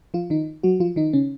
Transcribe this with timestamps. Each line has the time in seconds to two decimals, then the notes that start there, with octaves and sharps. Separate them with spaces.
0.14 F3 F4
0.30 D#3 D#4
0.63 F#3 F#4
0.80 F3 F4
0.96 D#3 D#4
1.13 C#3 C#4